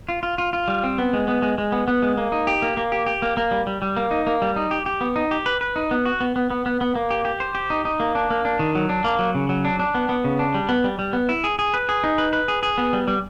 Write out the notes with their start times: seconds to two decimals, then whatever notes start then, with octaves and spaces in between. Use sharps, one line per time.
0.08 F4
0.23 F4
0.38 F4
0.53 F4
0.68 G3
0.83 C4
0.98 B3
1.13 G#3
1.28 B3
1.42 G#3
1.58 G#3
1.72 B3
1.88 B3
2.02 G#3
2.17 A#3
2.32 D#4
2.47 G4
2.62 A#3
2.77 A#3
2.92 G4
3.06 G4
3.22 A#3
3.37 A#3
3.51 G3
3.67 G3
3.82 G3
3.97 A#3
4.11 D#4
4.27 A#3
4.42 G3
4.56 D#4
4.71 G4
4.86 G4
5.01 B3
5.16 D#4
5.31 G4
5.46 B4
5.61 B4
5.76 D#4
5.91 B3
6.05 F#4
6.21 B3
6.36 B3
6.50 B3
6.66 B3
6.81 B3
6.95 A#3
7.11 G4
7.25 G4
7.40 C5
7.55 G4
7.70 D#4
7.85 D#4
8.00 A#3
8.15 D4
8.30 A#3
8.45 D4
8.59 D#3
8.75 F#3
8.89 D4
9.04 A#3
9.19 F#3
9.35 C#3
9.49 F#3
9.65 D4
9.80 D4
9.95 B3
10.09 B3
10.24 C#3
10.39 D4
10.54 G3
10.69 B3
10.84 G3
10.99 G3
11.13 B3
11.29 E4
11.44 G#4
11.59 G#4
11.74 B4
11.89 G#4
12.04 D#4
12.18 B4
12.33 B4
12.48 G#4
12.63 G#4
12.78 B3
12.93 G3
13.08 G3